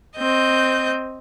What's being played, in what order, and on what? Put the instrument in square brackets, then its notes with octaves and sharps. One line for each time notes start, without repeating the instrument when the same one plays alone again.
[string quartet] C4 D#5 G6